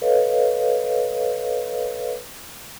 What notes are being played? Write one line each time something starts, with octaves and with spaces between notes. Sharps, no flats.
A4 B4 C#5 D#5 F5